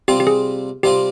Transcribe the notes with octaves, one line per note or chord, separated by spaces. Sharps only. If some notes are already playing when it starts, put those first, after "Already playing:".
C3 G3 C4 F4 G4
G4
G#4
C3 G3 C4 F4 G4